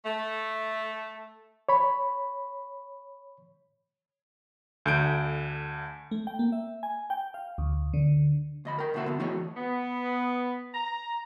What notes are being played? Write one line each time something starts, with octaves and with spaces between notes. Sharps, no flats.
A3
C#5 B5
D2 D3 G6 D7
A3
G5
A#3
E5
G#5
G5
F5
D2
D3
D2 D#5 B5
A#4 G5
D2 B2 D3 A#3 F#4 E5
D3 B3
E3 A3 F#4 G#4 C#5 D#5
B3
A#5